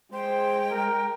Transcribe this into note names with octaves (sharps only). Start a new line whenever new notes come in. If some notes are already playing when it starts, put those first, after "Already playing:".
G#3 C5 G5
A#4